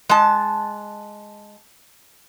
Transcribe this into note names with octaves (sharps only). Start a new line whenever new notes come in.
G#3 A5